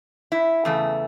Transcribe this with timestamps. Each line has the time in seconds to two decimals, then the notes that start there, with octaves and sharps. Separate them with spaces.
0.32 E4
0.65 E2 C#3 A3